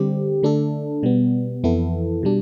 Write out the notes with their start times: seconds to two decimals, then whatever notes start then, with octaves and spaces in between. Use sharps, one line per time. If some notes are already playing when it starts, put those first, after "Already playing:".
Already playing: D3 G3 C4 G4
0.43 D3 A3 D4 A4
1.03 B2 G3 B3
1.64 F2 E3 B3 E4 A4
2.23 B2 G3 D4